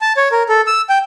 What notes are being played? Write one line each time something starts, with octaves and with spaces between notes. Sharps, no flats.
A5
C#5
A#4
A4
E6
G5